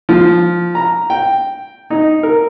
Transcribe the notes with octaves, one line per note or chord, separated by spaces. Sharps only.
F3
A#5
G5
D#4
A#4